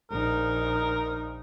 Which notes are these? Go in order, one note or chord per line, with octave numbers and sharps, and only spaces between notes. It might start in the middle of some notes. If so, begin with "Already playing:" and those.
A#1 D#4 A#4